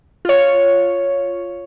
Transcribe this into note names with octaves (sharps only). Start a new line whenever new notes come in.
F4 C#5